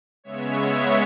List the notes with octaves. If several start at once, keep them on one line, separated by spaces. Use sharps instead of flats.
C#3 G#3 B3 C#5 E5